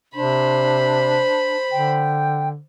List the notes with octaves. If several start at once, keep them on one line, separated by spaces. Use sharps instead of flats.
C3 D4 C5 B5
D3 G5